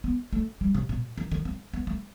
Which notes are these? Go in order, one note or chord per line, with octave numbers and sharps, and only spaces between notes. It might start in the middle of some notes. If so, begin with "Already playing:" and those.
B3
A3
G3
C3
B2
D#3
D#3
C4
B3
A3